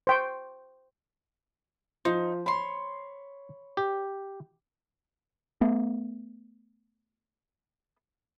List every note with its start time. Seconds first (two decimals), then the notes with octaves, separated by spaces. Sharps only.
0.07 C5 G5 C#6
2.05 F3 D#4 C5
2.46 C#5 B5 C6
3.77 G4
5.61 A3 B3